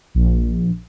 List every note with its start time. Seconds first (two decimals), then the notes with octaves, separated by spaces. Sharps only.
0.15 A#1